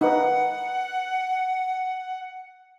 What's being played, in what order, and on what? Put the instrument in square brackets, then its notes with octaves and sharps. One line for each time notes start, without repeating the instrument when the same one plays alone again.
[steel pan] D#4 B4 [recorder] F#5